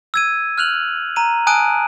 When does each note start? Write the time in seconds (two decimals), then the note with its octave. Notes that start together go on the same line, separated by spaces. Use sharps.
0.14 E6 G#6 D#7
0.58 F6 F#6 F7 F#7
1.16 A#5 D#7
1.47 G#5 A5 D#6 F#6 D7 D#7